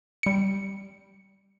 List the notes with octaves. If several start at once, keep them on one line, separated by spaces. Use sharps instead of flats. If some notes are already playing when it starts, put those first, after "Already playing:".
G3 C#7